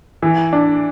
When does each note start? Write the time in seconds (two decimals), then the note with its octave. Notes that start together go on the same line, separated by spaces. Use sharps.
0.22 E3
0.53 D4